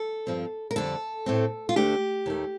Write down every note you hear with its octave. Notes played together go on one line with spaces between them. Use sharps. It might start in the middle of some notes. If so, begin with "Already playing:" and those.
Already playing: A4
G2 F3 C4
A#4
F2 D3 G3 A4
A2 A3 C4
F4
D2 D3 A3 D4 G4
D#2 D#3 A3